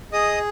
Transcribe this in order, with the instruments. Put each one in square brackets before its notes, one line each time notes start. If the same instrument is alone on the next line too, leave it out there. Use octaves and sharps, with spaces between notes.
[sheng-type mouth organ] G#4 D#5 D#6